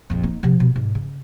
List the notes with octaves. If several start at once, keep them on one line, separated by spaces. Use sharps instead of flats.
A#1 F2
A#3 D#4
C3 F3
B2
G#2
C#3